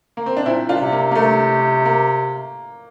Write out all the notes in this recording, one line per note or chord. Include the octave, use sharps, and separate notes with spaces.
A#3
C4
D4
A#2 C4 E4
D4 F4
C3
A#3
A#3
C3 A3
A#3